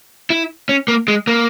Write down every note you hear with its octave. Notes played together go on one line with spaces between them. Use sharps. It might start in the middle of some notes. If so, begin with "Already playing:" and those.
E4
C#4
A#3
G#3
A#3